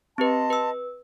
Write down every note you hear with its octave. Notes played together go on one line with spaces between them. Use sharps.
C4 G4 B4 D#5 A5 C6
B4 E6